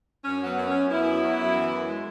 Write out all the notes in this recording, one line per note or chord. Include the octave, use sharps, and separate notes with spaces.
F#2 C#4
F#3
B3
F#2
C#4
F#2
F#2 B3 E4
F#3
F#3
F#2
E3
F#2
G#3